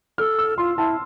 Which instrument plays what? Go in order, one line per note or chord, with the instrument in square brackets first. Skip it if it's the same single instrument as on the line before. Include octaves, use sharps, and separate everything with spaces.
[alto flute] A4 [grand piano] F6
[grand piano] E6
[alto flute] F4 [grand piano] C6
[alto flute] E4 [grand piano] A5